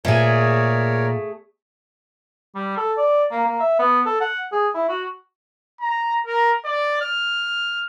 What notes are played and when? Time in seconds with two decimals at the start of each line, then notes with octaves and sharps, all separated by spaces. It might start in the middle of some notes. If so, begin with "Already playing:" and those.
0.05 A#2 A3 G#4 A#4 C#5 D5
2.55 G3
2.78 A4
2.97 D5
3.31 A#3
3.46 A#3
3.60 E5
3.79 B3
4.06 A4
4.21 F#5
4.52 G#4
4.75 E4
4.89 F#4
5.81 A#5
6.27 A#4
6.64 D5
7.02 F6